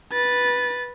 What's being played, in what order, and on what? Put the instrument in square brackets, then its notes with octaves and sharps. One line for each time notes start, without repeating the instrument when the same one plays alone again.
[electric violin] B4 A6